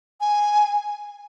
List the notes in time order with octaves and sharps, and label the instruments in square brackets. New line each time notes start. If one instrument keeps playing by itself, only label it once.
[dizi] G#5